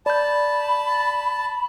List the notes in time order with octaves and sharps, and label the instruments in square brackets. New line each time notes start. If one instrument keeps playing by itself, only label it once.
[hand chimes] D5 G6 [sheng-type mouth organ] A5 [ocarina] B5